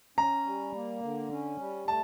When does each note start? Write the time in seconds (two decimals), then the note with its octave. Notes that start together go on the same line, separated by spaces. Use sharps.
0.18 C#4 A#5
0.46 G3
0.75 A#3
1.03 D3
1.31 C#4
1.59 G3
1.88 A3 A5